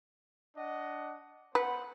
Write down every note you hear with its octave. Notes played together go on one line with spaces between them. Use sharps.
D4 D#5 F#5
B3 B4 C5 F#5